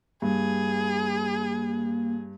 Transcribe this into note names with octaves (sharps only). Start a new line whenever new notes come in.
G2 A#3 G#4